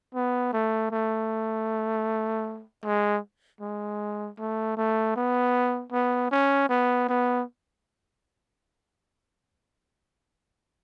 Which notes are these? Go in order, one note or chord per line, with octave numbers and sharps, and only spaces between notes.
B3
A3
A3
G#3
G#3
A3
A3
B3
B3
C#4
B3
B3